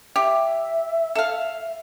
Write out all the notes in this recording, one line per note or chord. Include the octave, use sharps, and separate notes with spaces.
G4 E5
A4 F5